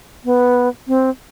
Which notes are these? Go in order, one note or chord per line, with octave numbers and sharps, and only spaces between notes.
B3
C4